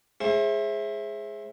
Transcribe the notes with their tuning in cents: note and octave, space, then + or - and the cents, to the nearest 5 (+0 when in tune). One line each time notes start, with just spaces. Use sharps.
G#3 +0 E4 +0 C5 +40